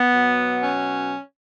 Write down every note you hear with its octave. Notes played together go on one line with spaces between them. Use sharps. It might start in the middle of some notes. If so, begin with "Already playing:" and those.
Already playing: B3
B2 F#3
C#4